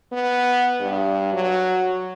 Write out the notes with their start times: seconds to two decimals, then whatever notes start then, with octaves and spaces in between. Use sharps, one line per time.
0.12 B3
0.80 G2
1.33 F#3